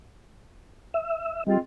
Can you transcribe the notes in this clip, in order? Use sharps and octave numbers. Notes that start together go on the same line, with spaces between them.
E5
G3 G#3 C4 F4